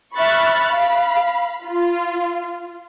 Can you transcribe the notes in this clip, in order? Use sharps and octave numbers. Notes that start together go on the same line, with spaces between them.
E5 B5 C#6 F6 F#6 A6
F5 B5
F4